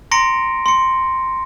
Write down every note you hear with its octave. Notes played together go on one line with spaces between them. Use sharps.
A#5 C6 A#6 C#7 D7
C6 C#7